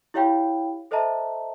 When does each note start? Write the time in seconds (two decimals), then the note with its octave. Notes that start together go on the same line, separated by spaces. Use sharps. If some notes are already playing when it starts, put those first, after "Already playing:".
0.14 E4 G4 C#5 F5 G5 B5
0.91 A4 C5 D#5 E5 A5 A#5